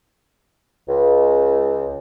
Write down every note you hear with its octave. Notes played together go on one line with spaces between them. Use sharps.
C#2